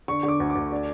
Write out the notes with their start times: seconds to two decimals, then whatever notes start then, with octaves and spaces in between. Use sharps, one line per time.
0.08 D3 C#6
0.23 D3
0.28 D6
0.40 D2
0.50 D6
0.55 D2
0.72 D4